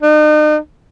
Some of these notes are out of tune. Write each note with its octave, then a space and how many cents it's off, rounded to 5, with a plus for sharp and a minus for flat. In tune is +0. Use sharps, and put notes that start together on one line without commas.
D#4 -40